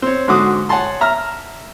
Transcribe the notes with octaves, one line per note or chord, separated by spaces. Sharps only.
C4 C#5
G#2 D3 F#4 D6 D#6
C#5 F#5 G#5 A5 C6
E5 A#5 F6